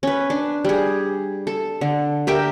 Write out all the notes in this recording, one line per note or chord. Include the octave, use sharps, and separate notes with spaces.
C#4 B4
D4
G3 G#4
A4
D3
G4 A#4 E5 G5